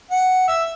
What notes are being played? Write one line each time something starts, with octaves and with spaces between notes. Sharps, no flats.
F#5
E5